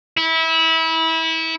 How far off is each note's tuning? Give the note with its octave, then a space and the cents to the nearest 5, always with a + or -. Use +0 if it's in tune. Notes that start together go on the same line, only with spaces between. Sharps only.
E4 -25